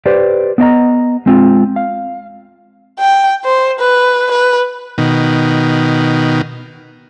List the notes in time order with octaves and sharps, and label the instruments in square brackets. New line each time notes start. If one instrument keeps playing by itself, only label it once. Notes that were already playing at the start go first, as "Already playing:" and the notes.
[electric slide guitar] G4 B4 C5 D5
B3 D4 D#5 A#5
G#3 C4 F4
F5
[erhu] G5
C5
B4
B4
[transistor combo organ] B2 D#3